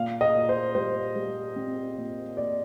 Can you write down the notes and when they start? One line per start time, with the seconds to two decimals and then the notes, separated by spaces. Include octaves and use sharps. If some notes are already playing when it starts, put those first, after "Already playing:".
Already playing: A#2 F5
0.21 D#5
0.35 A#2
0.49 C5
0.75 G3 C5
1.16 G3
1.56 C4
1.97 A#2
2.37 A#2 D5